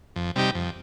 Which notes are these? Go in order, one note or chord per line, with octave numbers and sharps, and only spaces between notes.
F2
C3 G3 D#4 G4
F2